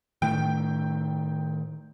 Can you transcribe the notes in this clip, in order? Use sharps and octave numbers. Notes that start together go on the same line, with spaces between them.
A2 D#3 A3 G5